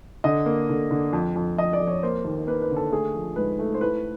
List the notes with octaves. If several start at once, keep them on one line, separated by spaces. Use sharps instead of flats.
D3 D#5
A#3
D3
D3
F2
F2
F2 D#5
D5
F2
C#5
A#3 C5
D#2
A#3 B4
B4
D3
A4
A3 G#4
F3
G#2 B4
A3
C5
A2 B4